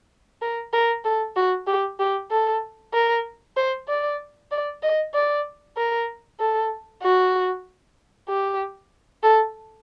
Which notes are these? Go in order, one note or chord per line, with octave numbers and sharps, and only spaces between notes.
A#4
A#4
A4
F#4
G4
G4
A4
A#4
C5
D5
D5
D#5
D5
A#4
A4
F#4
G4
A4